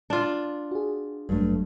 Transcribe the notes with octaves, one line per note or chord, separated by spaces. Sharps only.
D4 F4
F#4 G#4
G#1 G2 F#3 G3 A3